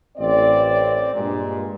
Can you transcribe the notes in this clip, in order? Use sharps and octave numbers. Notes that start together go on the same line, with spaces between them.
A1 C4 D5
G2 A#2 G#3